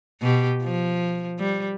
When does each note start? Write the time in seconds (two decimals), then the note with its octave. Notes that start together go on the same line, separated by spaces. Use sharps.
0.22 B2 G4
0.63 F3
1.39 G3